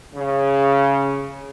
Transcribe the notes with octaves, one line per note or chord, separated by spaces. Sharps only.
C#3